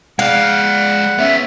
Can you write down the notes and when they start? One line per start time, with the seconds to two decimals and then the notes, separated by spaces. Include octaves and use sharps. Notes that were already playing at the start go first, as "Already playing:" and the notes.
0.19 G#3 D5 F5 F#5
1.18 B3 C#4 E5